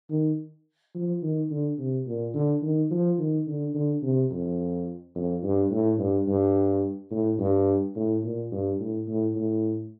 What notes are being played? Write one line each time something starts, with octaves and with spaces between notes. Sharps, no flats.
D#3
F3
D#3
D3
C3
A#2
D3
D#3
F3
D#3
D3
D3
C3
F2
F2
G2
A2
G2
G2
A2
G2
A2
A#2
G2
A2
A2
A2